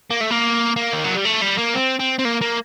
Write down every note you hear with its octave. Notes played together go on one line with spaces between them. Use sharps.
A#3
A3
A#3
A#3
D#3
F#3
G3
A3
G3
A#3
C4
C4
C4
A#3
A#3